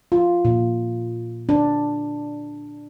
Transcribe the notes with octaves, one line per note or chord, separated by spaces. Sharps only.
F4
A#2
D4